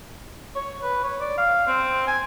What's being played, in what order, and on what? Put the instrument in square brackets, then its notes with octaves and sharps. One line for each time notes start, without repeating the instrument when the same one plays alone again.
[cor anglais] C#5
B4
C#5
D5
F5
C4
G#5